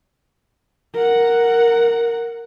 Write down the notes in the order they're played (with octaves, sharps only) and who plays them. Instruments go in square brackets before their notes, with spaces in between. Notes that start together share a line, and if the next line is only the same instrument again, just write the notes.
[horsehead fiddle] A#4 F#5